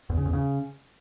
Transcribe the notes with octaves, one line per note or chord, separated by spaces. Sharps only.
E2
C#3
E2
C#3